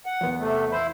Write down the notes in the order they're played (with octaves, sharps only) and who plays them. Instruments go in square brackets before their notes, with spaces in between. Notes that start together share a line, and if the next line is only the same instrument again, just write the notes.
[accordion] F#5
[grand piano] E2 B3
[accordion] C3 A3
[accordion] E4 C5 [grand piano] B5